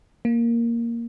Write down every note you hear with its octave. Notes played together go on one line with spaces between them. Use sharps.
A#3